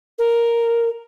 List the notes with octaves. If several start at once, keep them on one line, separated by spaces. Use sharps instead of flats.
A#4